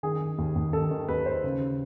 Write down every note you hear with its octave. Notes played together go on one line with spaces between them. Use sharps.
D#3 G#4
D#3
D#2
D#2
D#3 A4
D#3
D#2 B4
D#2 C5
C#3